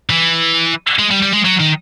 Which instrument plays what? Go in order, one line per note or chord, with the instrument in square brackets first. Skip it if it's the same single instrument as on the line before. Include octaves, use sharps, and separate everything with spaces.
[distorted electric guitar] E3
G#3
G3
G3
G#3
F#3
D#3